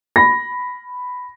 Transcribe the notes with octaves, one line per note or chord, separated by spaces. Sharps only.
B5 A#6